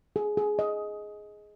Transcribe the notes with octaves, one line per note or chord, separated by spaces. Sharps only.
G#4
G#4
D#5